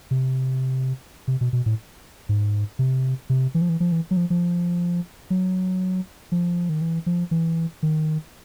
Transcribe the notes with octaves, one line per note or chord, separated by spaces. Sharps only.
C3
C3
B2
B2
A2
G#2
C3
C3
E3
F3
E3
F3
E3
F#3
F3
F3
F#3
F3
D#3
E3
F3
E3
D#3